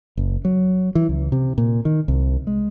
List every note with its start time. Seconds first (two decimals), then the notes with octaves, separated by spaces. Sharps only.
0.17 F#1
0.45 F#3
0.95 E3
1.09 C#2
1.32 C3
1.58 A#2
1.85 D#3
2.08 C2
2.47 G#3